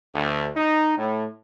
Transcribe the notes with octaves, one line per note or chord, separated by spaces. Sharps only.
D2
D#4
A2